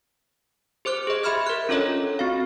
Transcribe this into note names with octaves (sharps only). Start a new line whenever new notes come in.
G4 C5 D6 F#6
G#4 D#5
G4 E5 B5 C6 F6 G#6
A#4 F#6
C#4 D4 F4 A4 C#5 D#5
C4 F#4 F5